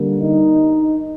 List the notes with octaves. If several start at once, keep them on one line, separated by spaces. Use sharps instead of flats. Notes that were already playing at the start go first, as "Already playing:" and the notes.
Already playing: D3 G3 A#3
D#4